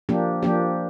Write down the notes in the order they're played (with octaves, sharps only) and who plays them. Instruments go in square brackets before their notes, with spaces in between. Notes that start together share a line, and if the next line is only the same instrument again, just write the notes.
[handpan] F3 A#3 D4 G4
F3 A#3 D4 G4